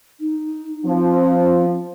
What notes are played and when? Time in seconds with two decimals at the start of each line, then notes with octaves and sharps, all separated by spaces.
0.21 D#4
0.86 F3 C4